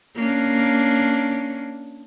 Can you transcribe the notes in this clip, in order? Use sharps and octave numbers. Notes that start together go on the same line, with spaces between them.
A#3 C#4 D4